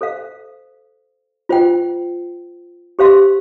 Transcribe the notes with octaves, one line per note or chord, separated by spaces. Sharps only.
A4 C5 F5
F4 C5 G5
G4 C5 F5 C6